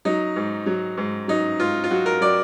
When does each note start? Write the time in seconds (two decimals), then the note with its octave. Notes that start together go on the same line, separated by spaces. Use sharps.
0.05 F#3 D#4
0.36 G#2
0.66 F#3
0.97 G#2
1.28 F#3 D#4
1.60 G#2 F4
1.84 F4
1.90 F#3 F#4
2.06 A#4
2.21 F#3 D5